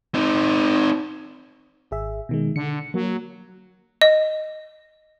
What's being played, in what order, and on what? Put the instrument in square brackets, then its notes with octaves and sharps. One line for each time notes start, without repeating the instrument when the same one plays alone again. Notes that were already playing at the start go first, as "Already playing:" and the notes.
[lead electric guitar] C4 D#4
[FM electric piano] G#1 G#4 E5
B2 D#3 G#3
[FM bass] D3 [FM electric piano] C#7
[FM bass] F#3 [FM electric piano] A#3
[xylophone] D#5